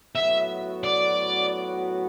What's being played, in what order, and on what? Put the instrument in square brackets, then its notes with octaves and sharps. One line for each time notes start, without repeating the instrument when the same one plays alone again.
[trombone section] A2 F#3 B3 F#4 [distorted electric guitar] E5
[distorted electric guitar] D5